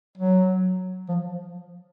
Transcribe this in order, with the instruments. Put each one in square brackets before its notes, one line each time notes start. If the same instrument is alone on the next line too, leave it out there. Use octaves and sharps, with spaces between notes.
[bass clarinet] F#3
F3